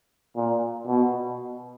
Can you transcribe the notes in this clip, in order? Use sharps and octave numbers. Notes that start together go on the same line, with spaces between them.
A#2
B2